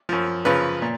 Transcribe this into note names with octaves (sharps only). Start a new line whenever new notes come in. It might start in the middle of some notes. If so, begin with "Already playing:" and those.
F#2 F3
F#2 C#3 F3 B4
A#2